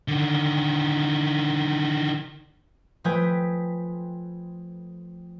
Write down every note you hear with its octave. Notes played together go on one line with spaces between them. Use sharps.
D3 D#3
F3 A3 B4 G5 G#5 D#6